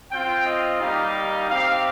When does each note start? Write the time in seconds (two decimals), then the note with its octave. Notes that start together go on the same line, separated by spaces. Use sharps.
0.11 C4 F4 G5
0.45 D#5
0.80 G3 A#3 D#4 G4 F5
1.49 C4 D#4 G4 F5